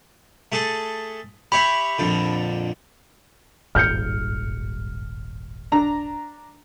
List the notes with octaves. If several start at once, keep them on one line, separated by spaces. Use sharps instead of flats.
A3 G#4 A4
G4 C#5 E5 B5
A#1 F2 D3
D#1 G#1 G2 F6 G6 C#7
D4 A#5